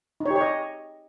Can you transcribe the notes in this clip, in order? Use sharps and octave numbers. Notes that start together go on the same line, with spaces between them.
D#4
C#5
G4
C#5
D#5